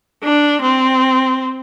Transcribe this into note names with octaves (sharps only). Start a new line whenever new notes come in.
D4
C4